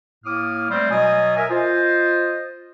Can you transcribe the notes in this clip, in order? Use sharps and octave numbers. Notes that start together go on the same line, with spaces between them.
A2 A#3 D6 D#6 F6
G3 A3 C4
B2 F#3 D#5 G#5 D#6
A#4 E5 G#5
F4 C5 D#5